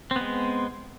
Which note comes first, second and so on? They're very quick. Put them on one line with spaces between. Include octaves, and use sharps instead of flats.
C4 B3 G#3